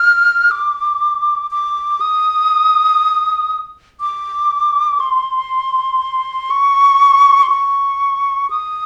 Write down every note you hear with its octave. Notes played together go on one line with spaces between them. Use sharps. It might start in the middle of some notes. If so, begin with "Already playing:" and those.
Already playing: F6
D6
D6
D#6
D6
C6
C#6
C6
C#6
D#6